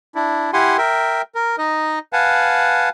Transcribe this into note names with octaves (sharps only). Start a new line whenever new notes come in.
D4 E4
E4 G4 F#5 G#5 C6
A#4 E5 G5
A#4
D#4 D#5
B4 F5 F#5 G#5 A5